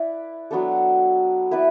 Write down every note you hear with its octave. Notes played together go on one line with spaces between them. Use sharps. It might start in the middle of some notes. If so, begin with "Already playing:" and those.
Already playing: E4 B4 D5
F#3 B3 D4 A4
B3 E4 B4 D5